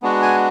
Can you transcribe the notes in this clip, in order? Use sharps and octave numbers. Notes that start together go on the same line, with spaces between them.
G#3 B3 D4 F#4
G#5